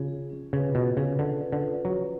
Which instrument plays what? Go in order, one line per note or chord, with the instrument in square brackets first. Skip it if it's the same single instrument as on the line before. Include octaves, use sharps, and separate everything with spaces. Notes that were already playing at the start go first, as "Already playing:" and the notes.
Already playing: [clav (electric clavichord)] C#3 [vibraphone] F4
[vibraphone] G#4
C#4
[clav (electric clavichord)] C#3 [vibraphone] B4
[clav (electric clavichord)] B2 [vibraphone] F4
[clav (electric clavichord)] C#3 [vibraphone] G#4
[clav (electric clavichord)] D3 [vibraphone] C#4
[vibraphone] B4
[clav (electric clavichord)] D3
[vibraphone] F4
[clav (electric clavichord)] F#3 [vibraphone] G#4